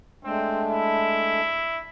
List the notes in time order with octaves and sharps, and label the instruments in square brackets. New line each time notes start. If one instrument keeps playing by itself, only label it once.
[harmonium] G#3 A3 D4 [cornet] C4
[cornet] E4